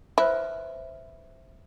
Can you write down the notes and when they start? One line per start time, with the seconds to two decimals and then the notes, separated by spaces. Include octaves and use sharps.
0.18 E4 B4 C5 E5